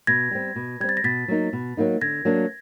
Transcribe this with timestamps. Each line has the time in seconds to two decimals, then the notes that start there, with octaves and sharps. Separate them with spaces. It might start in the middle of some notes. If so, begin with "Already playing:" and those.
0.07 B2 G#6 A#6
0.31 G3 C4
0.56 B2
0.80 G3 C4 G#6
0.89 A6
0.97 A#6
1.04 B2 A6 B6
1.28 F#3 A#3 D#4
1.53 B2
1.77 F#3 A#3 D#4
2.01 D3 G#6 A#6
2.25 F#3 A#3 D4